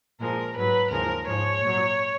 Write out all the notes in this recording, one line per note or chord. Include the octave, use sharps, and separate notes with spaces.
A#2 F3 G#3 A#4
G#2 F#3 B4
D#2 C#3 F3 G#3 A#4
G#2 F3 G#3 C#5
A#2 F#3